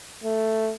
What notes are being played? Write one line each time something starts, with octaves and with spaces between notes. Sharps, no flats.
A3